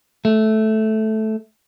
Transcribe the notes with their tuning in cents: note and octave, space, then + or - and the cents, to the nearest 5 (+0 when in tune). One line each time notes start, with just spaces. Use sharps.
A3 -10